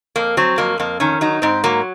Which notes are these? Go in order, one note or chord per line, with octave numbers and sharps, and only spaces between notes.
F2 A#3
F#3 C4
F2 A#3
F2 A#3
D#3 C#4
F#3 D#4
G#2 C4
F#3 A#3